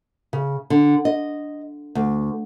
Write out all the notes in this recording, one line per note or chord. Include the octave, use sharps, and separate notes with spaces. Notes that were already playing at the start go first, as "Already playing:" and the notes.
C#3
D3
D#5
D2